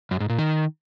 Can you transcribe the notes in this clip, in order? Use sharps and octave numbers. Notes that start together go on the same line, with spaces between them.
F#2
G#2
A#2
D#3